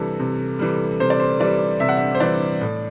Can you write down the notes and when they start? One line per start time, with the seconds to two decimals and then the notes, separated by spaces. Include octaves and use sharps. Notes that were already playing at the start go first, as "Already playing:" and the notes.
Already playing: C3 E3 G3 A4
0.20 C3
0.59 E3 G3
1.00 C3 C5
1.10 D5
1.20 C5
1.40 E3 G3 D5
1.80 C3 E5
1.89 F#5
1.97 E5
2.15 C5
2.20 E3 G3 D5
2.61 A2